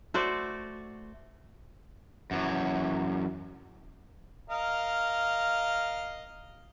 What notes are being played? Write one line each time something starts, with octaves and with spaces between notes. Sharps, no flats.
A3 F#4 C5 D5
F#2 E3
A#4 D#5 F5